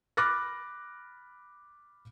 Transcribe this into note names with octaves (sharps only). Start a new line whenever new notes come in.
B5 D6 F6 F#6 A6 A#6